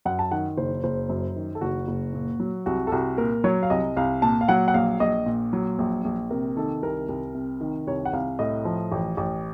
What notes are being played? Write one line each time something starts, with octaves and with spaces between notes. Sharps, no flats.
F#2 F#5
A5
D#3 F#5
F#1 C5
F#1 C5
F#2
D#3
A4
F#1 F#4
F#1
A#2
F#3
C2 F#4
A4
C2 F#4
A#2 A#4
F#3 C#5
F5
C2 D#5
C2 F5
A#2 A5
F5
F#3 F#5
F#5
A#1 F5
A#1 D#5
A#2
F#3
A#1
A#1
C3 A#4
D#3 A4
C2 A#4
C2
C3
D#3
C2 C#5
F#5
C2 F5
A2 D#5
F3
A1
A1